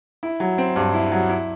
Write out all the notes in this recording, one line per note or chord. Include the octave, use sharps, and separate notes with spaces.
E4
F#3
C4
G2
E4
F#3
E4